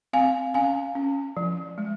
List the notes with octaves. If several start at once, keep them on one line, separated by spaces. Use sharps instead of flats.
C4 F5 G#5
C#4 F5 G#5
C#4
F3
G#3